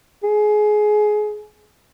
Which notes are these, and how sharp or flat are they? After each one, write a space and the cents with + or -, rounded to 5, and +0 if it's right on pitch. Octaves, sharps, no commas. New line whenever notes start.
G#4 +20